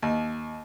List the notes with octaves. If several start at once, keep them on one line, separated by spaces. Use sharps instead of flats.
D#2